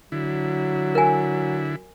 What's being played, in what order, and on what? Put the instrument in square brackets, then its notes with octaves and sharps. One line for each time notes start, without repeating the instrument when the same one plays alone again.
[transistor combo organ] D3 E4 [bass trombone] F#3
[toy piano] A#4 G#5